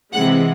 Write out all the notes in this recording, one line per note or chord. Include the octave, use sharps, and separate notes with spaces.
C3 E3 G#3 F#5